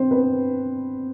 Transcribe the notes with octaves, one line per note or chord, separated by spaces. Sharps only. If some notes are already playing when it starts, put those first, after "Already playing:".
Already playing: C4 C5
B3 B4